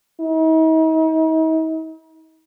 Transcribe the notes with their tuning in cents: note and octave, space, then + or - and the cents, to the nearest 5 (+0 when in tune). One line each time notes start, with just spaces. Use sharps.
D#4 +45